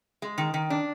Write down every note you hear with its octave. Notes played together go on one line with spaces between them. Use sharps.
G#3
D#3
D#3
D4